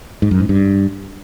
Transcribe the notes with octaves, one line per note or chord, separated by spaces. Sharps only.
G#2
F#2
G#2
G2